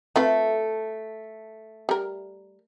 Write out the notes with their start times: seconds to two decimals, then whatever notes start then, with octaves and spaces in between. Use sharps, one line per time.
0.16 A3 C4 F4 B4
1.89 G3 A#4